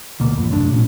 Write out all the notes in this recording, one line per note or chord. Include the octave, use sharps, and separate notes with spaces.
D2 B2 A#3
A1 F2
C2 F#2 A3 D4
A#2 C#4